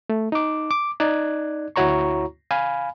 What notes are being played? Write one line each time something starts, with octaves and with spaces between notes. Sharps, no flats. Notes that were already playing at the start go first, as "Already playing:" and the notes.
A3
D#4 D6
D6
D#4 D5 F#6 G#6
D2 E4 F#4 C#5 A#5 C#6
F5 G#5 B5